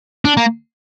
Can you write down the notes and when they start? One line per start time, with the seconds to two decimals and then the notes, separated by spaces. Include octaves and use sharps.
0.25 D4
0.37 A#3